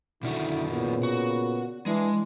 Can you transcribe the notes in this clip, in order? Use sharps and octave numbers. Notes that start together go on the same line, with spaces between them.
B2 D3 D#3 E4 F#4
A#2 C#3 B3
F#4
E3 G#3 D4 E4